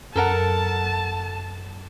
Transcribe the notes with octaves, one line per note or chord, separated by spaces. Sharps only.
F#2 A4 A#4 F#5 A5